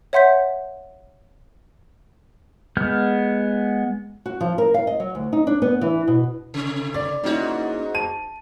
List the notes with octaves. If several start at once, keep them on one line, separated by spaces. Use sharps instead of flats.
C#5 E5 F#5 C6 G6 B6
G#3 B3 F6 G6
F#4
F3
A#4
F5
D#5
F#3
D2
D#4
D4
B3
E3
B2
C3
D5
G#2 A#3 C#4 D#4 E4 F#4
A5 D#7